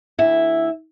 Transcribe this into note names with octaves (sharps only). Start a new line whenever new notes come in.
D2 E4 E5